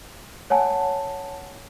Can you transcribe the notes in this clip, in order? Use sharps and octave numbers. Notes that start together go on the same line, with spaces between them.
C#5 F#5 G#5 A5